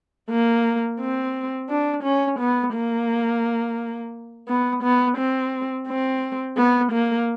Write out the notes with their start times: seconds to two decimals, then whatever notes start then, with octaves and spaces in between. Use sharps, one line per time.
0.30 A#3
0.99 C4
1.69 D4
2.03 C#4
2.39 B3
2.73 A#3
4.48 B3
4.83 B3
5.17 C4
5.87 C4
6.57 B3
6.92 A#3